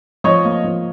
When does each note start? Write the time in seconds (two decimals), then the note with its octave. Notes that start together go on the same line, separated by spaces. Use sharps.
0.24 F3 C#5 D#5
0.45 A#3
0.64 F3